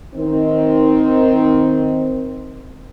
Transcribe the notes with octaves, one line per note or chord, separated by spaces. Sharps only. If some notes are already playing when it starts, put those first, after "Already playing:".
D#3 C4